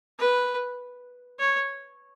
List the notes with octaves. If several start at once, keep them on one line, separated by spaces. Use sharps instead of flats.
B4
C#5